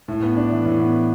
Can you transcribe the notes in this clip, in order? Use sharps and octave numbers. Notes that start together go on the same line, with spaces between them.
A2
B3
D4
E3
A2
B3